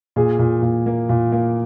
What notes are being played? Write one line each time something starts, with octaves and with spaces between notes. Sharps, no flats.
A#2 G#4
A#2
A#2
A#3
A#2
A#3